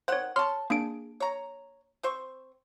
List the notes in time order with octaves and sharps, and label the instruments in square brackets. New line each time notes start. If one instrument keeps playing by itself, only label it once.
[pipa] D#3 F#5 [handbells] C5 C#5
[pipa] C#5 A5 [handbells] C6 F6
[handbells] A#3 D4 D7 [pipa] G#4
[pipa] C#5 A#5
C4 C5 C#6